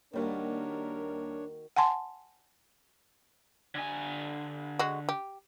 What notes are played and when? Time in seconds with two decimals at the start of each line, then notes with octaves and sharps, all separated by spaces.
0.13 D#2 D#3 G3 A#3 D4 F#4 A#4 C#5
1.76 F#5 G#5 A5 C6
3.75 D3 G#5
4.79 G#3 F#4
5.09 G4